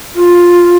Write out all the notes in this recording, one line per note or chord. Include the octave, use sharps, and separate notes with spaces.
F4